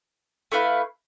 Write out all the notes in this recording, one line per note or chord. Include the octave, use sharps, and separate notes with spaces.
A3 E4 B4 F5